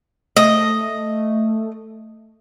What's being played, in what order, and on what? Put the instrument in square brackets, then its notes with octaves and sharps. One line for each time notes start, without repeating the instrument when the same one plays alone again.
[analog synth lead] A3 [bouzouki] D#5